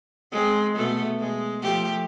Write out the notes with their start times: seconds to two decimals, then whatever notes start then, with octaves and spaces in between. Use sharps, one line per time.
0.32 G#3 C4
0.75 B2 A3 B3
1.19 G#3
1.62 F3 A3 G4